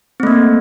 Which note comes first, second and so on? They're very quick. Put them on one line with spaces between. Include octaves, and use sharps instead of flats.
C4 A3 A#3